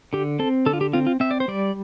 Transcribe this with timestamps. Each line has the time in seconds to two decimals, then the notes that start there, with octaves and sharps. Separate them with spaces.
0.13 D3 G4
0.39 C4 A4
0.66 D3 A4
0.73 F4
0.81 G4
0.93 C4 F4
1.07 F4
1.20 C4 E5
1.31 D5
1.40 C5
1.48 G3 D5